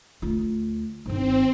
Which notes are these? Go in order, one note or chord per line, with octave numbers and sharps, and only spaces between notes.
D2 F4
G1 D#3 C4